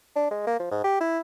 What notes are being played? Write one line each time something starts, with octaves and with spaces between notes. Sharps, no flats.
D4
G#3
A#3
F3
G#2
G4
E4